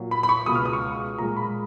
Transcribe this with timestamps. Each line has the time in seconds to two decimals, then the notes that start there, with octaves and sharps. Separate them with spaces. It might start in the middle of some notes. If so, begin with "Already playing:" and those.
Already playing: A#2 F#3
0.11 B5
0.23 B5
0.29 C#6
0.46 C#2 B2 G#3 D#6
0.55 F6
0.66 D#6
0.73 C#6
1.18 A#2 G#3 A#5
1.36 B5